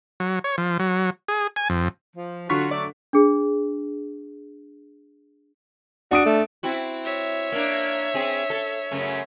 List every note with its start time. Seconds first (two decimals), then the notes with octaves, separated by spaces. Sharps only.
0.20 F#3
0.44 C#5
0.58 F3
0.79 F#3
1.29 G#4
1.56 G#5
1.70 F2
2.16 F3
2.50 D3 F#3 F4 F#4 C#6 B6
2.71 F#3 A3 D5
3.13 D4 G#4
6.11 D4 F#4 D#6 D7
6.26 A3
6.63 C4 E4 F#4
7.04 C#5 E5
7.52 A#3 D4
8.14 C4 G#4
8.50 A4
8.91 F#2 C#3 A3